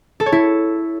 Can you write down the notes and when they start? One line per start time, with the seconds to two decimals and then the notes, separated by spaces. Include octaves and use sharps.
0.20 A4
0.26 C#5
0.32 E4